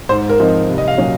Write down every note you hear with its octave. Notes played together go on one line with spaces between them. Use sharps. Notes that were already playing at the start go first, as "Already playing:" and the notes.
G#2 C5
A#4
F3 C4 D#4
C2
D#5
F5
A#2 F#3 C#4